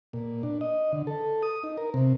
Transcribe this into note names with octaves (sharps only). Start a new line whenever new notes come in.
A#2
D4
D#5
D3
A4
D#6
D#4
A#4
C3